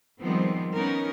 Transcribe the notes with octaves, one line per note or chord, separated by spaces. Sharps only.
D#3 F3 G3 G#3 B3 C4
B3 C#4 D#4 A#4